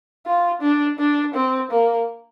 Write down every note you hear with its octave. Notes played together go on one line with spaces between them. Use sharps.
F4
D4
D4
C4
A#3